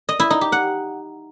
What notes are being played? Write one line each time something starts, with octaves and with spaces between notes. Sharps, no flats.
D#5
E4
D#4
G4
F#5